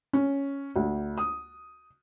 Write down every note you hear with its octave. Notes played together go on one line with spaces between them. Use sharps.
C#4
D2
D#6